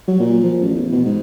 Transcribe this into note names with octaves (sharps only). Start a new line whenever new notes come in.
F#3
A#2
F3
A1
E2
B2
G#2